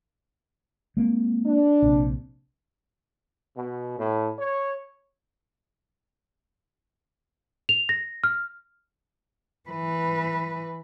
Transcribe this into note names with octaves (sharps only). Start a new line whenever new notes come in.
G#3 A#3 C4
D4
A#1 C3
B2
A2
C#5
F7
A#6
F6
E3 B4